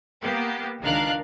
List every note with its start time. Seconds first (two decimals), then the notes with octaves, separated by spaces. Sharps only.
0.22 A#3 B3 G4
0.82 C#2 D#3 D4 A#4 F5 F#6